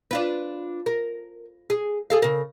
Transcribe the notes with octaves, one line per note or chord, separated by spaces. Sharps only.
D4 F4 B4
A#4
G#4
G#4 A4 F5
C#3 A#4